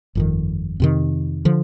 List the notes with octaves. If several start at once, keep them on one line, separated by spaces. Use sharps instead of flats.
G1 F2 D#3
F2 C3 D#3
D3 F3